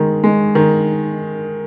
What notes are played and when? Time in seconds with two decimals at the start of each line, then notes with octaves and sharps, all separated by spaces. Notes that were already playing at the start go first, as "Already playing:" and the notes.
Already playing: D#3 G#3
0.24 G#3
0.55 D#3